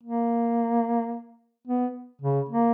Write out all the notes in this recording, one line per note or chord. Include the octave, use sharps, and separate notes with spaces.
A#3
B3
C#3
A#3